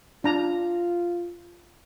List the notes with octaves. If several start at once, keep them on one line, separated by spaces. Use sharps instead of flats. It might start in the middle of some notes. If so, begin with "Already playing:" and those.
D4 F4 A#5